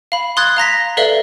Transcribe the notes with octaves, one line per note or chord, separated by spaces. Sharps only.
F5 B5
C6 D#6 F#6 G#6 A6
F5 A#5 A#6 B6
A4 B4 D5 E5 F5 G7